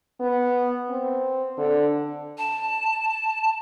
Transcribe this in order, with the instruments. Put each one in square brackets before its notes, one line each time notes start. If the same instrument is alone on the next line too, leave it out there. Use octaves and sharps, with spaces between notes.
[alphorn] B3
C4
D3
[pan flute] A5